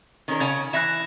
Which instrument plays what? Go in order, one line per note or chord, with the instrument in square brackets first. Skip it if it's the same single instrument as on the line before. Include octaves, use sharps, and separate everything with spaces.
[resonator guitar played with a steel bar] D#3 C#4 A#4
[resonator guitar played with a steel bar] C#3 C#5 A5 [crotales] G#6
[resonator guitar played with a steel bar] E3 E5 [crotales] F#6 A#6 E7